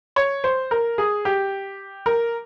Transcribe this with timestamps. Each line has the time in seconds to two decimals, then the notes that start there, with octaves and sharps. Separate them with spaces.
0.16 C#5
0.44 C5
0.71 A#4
0.98 G#4
1.25 G4
2.06 A#4